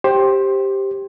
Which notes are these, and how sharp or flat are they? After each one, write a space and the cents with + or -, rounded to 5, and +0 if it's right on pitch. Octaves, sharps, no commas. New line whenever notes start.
G4 +0 C5 +15